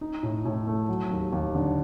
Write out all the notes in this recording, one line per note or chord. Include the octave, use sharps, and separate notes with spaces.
D#4
A2
A2
A3
F#3
D#2
D#2
D3